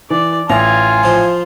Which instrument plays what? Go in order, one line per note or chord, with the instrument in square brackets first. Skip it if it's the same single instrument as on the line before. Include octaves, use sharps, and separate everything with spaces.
[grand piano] E3 [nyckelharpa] D5
[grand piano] A1 [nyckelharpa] F4 [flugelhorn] G#5 [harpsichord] A#5
[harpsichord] F3 C5